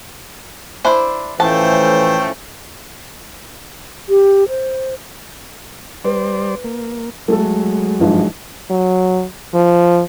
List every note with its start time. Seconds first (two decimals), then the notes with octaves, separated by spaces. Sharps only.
0.85 D4 E4 C5
1.40 A2 E3 F3 A3 C#4 C5 G5 A5
4.09 G4
4.49 C5
6.05 G3 B4 C5 D5
6.64 A#3
7.28 F#3 G#3 A3 A4
8.00 G#1 G2 F3
8.70 F#3
9.54 F3